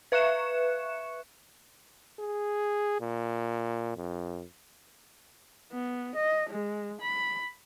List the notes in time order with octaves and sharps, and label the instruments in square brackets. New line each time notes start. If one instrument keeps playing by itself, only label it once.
[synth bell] B4 E5 C#6 F#6 C#7 E7
[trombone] G#4
A#2
F2
[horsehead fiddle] B3
D#5
G#3
B5